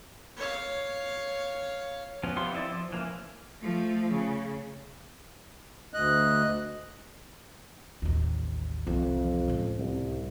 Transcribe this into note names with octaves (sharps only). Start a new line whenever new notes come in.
C#5 F5
F3 B3 C#4
E3 B3 F4 G4 C6
C4 D#4 E4 D5
F3
E3 A#3 C#4
F3 A3
C#3
D2 D#5 F#6
A1 D#2
C2 F2 E3
C#2 A2
C2